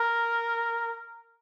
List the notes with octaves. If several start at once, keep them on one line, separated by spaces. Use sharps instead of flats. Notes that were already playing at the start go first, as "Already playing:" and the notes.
Already playing: A#4